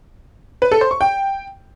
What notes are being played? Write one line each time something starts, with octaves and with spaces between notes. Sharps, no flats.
B4
A4
C5
C#6
G5